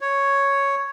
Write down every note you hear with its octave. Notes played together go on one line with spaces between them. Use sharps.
C#5